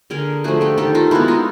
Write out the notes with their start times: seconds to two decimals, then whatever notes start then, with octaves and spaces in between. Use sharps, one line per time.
0.10 D3 G#4 A#4
0.44 F3 A3 F#4 G#4
0.61 G4 A4
0.78 D#3 G4 A4
0.95 D#4 F4
1.11 G#3 B3 E4 F#4
1.28 D#4 F4